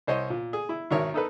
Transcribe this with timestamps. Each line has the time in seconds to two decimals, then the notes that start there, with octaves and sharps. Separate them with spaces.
0.07 C2 C5 C#5 D#5
0.30 A#2
0.53 G#4
0.69 E4
0.91 G#1 B2 D#3 A#4 C#5 E5
1.14 D#4 A4 B4